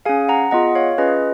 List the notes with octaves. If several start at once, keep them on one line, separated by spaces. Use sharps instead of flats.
C#4 G#4 F5 G#5
F#5 A#5
B3 F4 G#4 D#5 F#5
C#5 F5
C#4 F4 G#4 B4 D#5